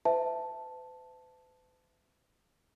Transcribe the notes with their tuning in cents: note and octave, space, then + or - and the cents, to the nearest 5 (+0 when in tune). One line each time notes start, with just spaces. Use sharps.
B4 +45 E5 +0 A5 +0